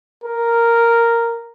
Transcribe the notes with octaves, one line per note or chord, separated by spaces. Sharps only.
A#4